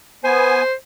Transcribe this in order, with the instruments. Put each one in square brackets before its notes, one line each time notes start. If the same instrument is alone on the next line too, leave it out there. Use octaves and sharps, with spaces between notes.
[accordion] B3 G#5 [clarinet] C5